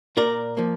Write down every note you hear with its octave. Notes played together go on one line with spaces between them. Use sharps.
A#2 A#4 D5
F3 A#3